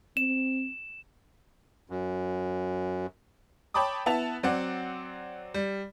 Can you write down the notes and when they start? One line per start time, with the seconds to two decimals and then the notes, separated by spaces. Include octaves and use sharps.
0.17 C4 E7
1.90 F#2
3.74 C#5 G5 A5 B5 D6 D#6
4.06 B3 E4 A5 F7
4.43 F#3 C4 D5 F#5
5.54 G3